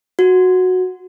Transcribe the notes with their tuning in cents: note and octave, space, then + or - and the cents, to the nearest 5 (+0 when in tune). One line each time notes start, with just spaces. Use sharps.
F#4 -10